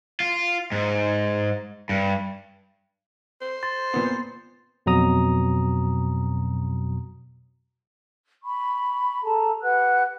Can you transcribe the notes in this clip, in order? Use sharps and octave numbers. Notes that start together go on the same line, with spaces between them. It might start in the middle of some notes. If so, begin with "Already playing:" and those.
F4
G#2
G2
C5
C6 A6
A#2 B3
F2 B2 F#3 A#5 D#6
B5 C#6
G#4 A4 A5 A#5
G4 B4 F#5 F#6